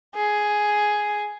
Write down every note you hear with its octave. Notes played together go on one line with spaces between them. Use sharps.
G#4